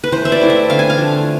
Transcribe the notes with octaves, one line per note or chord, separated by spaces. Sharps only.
B4
E3 C5
E5
D5
A3 C4 E4
E5
D3 F5
G#5
F5
F3 A3 D4